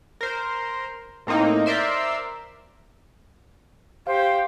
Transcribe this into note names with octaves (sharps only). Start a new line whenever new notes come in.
A#4 C5
A2 A#3 C4 D#4
A#4 C5 D5 E5 C6
G4 C5 F5